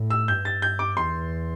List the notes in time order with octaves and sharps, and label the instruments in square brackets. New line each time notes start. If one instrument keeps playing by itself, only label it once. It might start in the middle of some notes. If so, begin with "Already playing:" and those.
Already playing: [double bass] A2
[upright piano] E6
[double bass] G2 [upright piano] G6
[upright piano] A6
G6
D6
[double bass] E2 [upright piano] C6